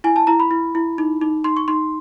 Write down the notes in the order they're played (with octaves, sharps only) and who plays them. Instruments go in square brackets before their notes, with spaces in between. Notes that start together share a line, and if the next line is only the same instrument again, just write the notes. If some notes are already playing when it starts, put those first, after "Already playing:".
[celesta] E4 G#5
A5
E4 A#5
B5
E4
E4
D#4
D#4
D#4 C6
C#6
D#4 C6